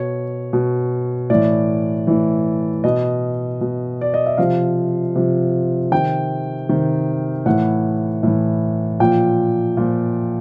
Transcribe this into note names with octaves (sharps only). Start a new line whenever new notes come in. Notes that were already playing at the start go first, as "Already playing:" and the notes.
Already playing: B2 C#5
B2
A2 E3 D5
A2 E3
B2 D#5
B2
D5
D#5
E5
C3 F3 F5
C3 F3
C3 D#3 G5
C3 D#3
A2 E3 F#5
A2 E3
A#2 F3 G5
A#2 F3